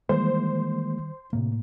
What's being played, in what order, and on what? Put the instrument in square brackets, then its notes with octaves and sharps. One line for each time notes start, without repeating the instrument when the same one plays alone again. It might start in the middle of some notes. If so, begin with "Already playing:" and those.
[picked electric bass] D#3 G3 [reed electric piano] E3 G#3 A#3 [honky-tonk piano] C5
[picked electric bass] A2 A#3 [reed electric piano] C3